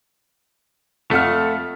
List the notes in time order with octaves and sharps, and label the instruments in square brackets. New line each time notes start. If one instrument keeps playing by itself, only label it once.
[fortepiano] F2 [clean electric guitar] A3 [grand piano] F4 F#5 F6 [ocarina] A4